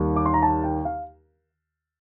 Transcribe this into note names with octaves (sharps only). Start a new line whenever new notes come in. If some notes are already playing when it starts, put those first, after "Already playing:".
Already playing: D#2 D#3 G3
D6
C6
A#5
A5
G5
F5